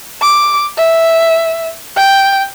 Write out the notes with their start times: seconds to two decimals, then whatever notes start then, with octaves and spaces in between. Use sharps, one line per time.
0.22 D6
0.78 E5
1.96 G5